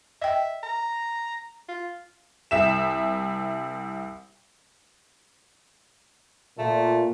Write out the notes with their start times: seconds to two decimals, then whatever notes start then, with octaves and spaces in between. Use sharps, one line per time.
0.22 D#5 E5 G5
0.63 A#5
1.69 F4
2.51 C2 E5 E7
6.59 A#2 A3